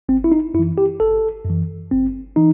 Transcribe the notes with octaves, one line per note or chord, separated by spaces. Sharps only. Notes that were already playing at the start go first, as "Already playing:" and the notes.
G1 C4
E4
D#4
F#2 E4
E3
G4
G1 A4
F#2 E3
G1 C4
E3 D#4